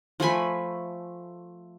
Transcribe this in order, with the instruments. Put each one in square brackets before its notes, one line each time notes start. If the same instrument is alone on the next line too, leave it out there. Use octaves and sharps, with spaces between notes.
[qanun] F3 A3 G#5 B5